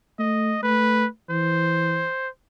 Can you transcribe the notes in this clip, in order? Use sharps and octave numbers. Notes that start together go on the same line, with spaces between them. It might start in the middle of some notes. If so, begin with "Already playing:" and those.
A3 D#5
A3 B4
E3 C5